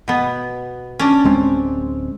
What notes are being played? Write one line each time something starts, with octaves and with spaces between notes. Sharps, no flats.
B2 B3
C#4 D4
D1 G#3 C4